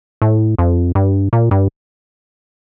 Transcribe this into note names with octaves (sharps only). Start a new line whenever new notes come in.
A2
F2
G2
A#2
G2